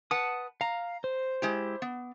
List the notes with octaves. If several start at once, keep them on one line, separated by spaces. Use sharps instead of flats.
B4 F#5 A5 D#6
F5 A#5
C5
G#3 E4 G4
B3